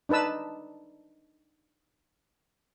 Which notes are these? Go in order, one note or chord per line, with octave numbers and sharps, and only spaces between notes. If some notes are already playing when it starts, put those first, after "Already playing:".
D4 D#4 B4 A5 E6